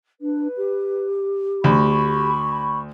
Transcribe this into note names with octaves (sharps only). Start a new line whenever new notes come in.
D4 B4
G4
D2 B5 C#6